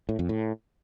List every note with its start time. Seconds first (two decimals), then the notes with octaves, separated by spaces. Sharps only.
0.09 A2
0.19 F2
0.29 A2